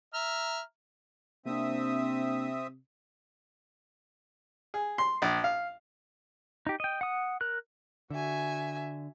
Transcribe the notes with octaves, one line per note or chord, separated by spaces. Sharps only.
E5 A#5 F6
C3 A#3 C4 D4 E5 D#6
G#4
C6
A#1
F5
D#4 G4
D#5 G5
F#5 D#6
A#4 F#6
D3 F#4 E5 G#5